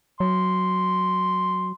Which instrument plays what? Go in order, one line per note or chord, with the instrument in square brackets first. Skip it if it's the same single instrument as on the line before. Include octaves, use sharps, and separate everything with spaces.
[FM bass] F#3 [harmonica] C6